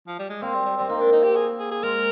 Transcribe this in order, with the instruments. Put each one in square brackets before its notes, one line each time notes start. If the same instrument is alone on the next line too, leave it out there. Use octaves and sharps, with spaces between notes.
[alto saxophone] F3
G3
G#3
[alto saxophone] A#3 [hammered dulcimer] C4
[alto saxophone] G3
G3
[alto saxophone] G3 [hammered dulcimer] C4
[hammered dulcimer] A#3 [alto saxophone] D#4
[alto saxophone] D4
D#4
G4
G#4
G#4
G#4
[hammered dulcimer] G#3 [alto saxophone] A#4